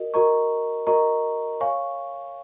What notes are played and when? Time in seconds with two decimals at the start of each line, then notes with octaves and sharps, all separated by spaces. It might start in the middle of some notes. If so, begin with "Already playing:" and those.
Already playing: F#4 A#4 D#5
0.14 F#4 A#4 D#5 A#5 C#6
0.87 F#4 A#4 D#5 A#5 C#6
1.61 C#5 F5 G#5 C#6